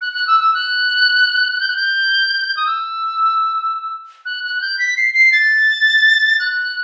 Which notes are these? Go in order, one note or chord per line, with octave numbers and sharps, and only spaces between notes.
F#6
F#6
E6
E6
F#6
G6
F#6
G6
D#6
E6
F#6
F#6
G6
B6
C7
C7
A6
F#6